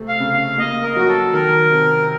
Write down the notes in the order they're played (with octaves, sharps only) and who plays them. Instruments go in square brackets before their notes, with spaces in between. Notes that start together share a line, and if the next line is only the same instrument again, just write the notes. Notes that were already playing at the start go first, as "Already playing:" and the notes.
Already playing: [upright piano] C3 A3
[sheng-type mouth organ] F5
[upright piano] C#3
[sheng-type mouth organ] F5
[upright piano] A#3 [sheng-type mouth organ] D#5
[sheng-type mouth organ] A#4
[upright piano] F#3 [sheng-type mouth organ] F#4
[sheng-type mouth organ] A4
[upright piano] D#3 [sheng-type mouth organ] A#4
[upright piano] C3